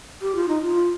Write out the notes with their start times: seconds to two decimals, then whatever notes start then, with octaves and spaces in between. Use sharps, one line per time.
0.21 G4
0.35 F4
0.48 D#4
0.62 F4